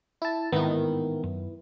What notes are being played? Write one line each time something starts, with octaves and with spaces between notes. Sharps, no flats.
E4 A5
A1 G#2 D#3 B3 C4 E4
F#2